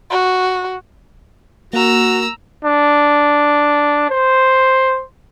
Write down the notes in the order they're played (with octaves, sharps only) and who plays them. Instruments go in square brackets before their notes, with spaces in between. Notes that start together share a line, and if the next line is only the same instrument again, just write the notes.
[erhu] F#4
[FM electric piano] A#3 A#4 [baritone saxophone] F#4 [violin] A#5 E6
[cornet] D4
C5